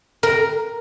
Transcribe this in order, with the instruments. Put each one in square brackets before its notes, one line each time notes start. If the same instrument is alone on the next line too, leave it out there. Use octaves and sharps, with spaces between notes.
[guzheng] A#4